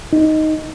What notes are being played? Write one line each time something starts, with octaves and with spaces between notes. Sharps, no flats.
D#4